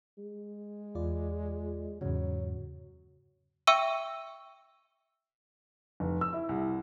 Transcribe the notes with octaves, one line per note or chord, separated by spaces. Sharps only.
G#3
E2 F4 D5
E2 G#2 C#3 F#3
E5 G5 C#6 E6 D#7
F1
E6
E4
C2